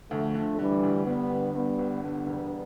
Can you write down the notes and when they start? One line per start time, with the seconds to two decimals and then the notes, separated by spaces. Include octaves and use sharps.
0.11 D2 F3 A3
0.34 D3
0.59 D3 E3 G3
0.83 D2
1.06 G1 G3 B3
1.31 D3
1.54 G2 G3 B3
1.79 G1
2.03 D3 G3 B3
2.27 E1